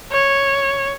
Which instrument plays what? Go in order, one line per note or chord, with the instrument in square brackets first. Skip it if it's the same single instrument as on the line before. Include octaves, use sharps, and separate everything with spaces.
[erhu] C#5